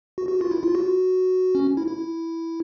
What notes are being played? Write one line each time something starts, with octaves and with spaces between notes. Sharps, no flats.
F#4
F#4
F4
E4
F4
F#4
C#4
E4
E4